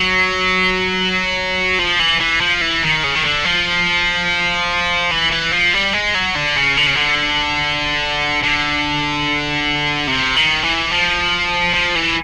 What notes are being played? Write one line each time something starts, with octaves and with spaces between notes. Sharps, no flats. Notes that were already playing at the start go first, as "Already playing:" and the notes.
Already playing: F#3
F3
E3
E3
F3
E3
D#3
C#3
D#3
D3
F3
E3
E3
F3
G3
G#3
F#3
D3
C#3
D3
C#3
D3
D3
C3
D#3
E3
F3
F3
E3